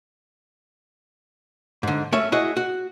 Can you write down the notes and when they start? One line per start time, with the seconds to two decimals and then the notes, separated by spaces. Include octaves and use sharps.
1.83 G#2 D3
2.12 A3 C#4 E5
2.32 E4 F#4 G#4 D#5
2.57 F#4